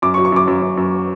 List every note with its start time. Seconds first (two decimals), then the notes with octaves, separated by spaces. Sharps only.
0.02 F#2 D6
0.14 C#6
0.18 F#3
0.25 C#6
0.32 F#2 D6
0.47 F#2
0.62 F#2
0.77 F#2